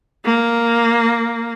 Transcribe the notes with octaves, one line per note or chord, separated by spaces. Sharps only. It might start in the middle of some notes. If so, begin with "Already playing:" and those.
A#3